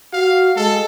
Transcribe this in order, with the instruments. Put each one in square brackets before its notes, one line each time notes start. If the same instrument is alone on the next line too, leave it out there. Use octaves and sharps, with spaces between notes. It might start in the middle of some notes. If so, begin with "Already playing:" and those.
[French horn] F#4 [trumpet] F5
[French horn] G#3 [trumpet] A4